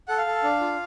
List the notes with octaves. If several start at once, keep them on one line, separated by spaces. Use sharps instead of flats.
A4 F#5
F5
A4
D4
F4